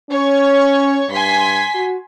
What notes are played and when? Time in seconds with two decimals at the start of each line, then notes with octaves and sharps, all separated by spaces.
0.11 C#4 C#5 C#6
1.11 G2 G#5 C6 B6
1.75 F#4